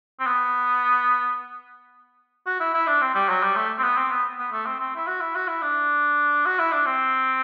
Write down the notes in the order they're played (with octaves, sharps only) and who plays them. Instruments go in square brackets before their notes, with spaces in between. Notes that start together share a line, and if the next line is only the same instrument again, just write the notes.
[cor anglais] C4
B3
F#4
E4
E4
D4
C4
G3
F#3
G3
A3
C4
B3
C4
B3
B3
A3
C4
C4
E4
F#4
E4
F#4
E4
D4
F#4
E4
D4
C4